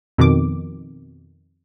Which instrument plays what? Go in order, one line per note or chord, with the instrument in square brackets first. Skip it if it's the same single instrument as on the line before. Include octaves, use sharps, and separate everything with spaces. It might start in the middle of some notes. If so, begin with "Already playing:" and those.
[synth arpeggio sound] F2 B2 D#3 D6